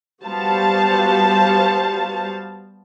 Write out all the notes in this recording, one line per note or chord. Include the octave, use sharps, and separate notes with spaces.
G3 B3 F#4 C5 F5 A5